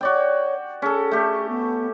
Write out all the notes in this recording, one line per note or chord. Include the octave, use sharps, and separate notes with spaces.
F#4 C#5 D5 G5
C#4 G#4 A4
A3 G4
B3